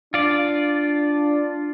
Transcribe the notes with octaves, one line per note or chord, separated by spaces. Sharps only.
D4 F4 D5